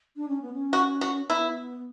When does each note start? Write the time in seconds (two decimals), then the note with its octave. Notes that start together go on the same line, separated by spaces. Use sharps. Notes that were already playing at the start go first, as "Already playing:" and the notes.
0.17 D4
0.28 C#4
0.42 B3
0.53 C#4
0.73 F#4
1.01 F#4
1.29 B3 E4